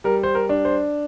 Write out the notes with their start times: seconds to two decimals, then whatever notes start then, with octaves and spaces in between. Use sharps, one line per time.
0.04 G3 A#4
0.23 C5
0.35 A#4
0.49 D4
0.65 C5